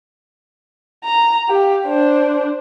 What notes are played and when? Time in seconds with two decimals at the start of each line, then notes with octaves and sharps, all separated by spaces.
1.04 A#5
1.49 G4 F5
1.86 D4 C5